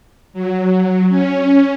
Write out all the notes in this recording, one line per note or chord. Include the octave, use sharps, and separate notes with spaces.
F#3
C#4